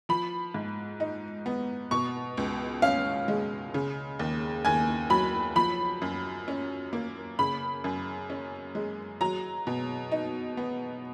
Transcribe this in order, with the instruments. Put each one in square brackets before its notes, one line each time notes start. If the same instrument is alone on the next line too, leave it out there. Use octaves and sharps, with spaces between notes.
[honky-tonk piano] F3 B5
G#2
D#4
B3
B2 C#6
C#2
C#4 F5
G#3
C#3
D#2
D#2 G#5
F#3 B5
F3 B5
F#2
C#4
A#3
C#3 B5
F#2
C#4
G#3
F#3 A#5
B2
D#4
B3